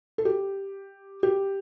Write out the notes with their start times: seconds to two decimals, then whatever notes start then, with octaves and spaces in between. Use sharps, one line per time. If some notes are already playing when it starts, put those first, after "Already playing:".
0.18 A4
0.25 G4
1.23 G4